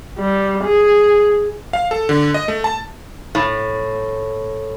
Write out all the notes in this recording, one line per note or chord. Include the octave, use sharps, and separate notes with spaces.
G3
G#4
F5
A4
D3
D#5
A3
A5
A2